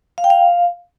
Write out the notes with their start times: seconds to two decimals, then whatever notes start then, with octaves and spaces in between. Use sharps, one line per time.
0.18 F5
0.24 G5
0.30 F5